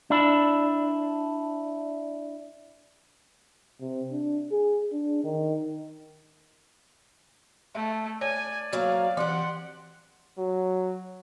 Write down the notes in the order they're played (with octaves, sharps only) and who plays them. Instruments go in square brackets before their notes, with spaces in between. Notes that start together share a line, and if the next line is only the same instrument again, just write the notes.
[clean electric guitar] D4 E4
[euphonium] C3
D4
G#4
D4
D#3
[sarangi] A3 [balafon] E5
[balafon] C#5 [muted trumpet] D5 [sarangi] G#5
[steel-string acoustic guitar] G#2 F#3 A#3 [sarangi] F5
[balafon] E3 [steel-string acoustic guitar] C4 G4 [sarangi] F#5 [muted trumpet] C6
[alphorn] F#3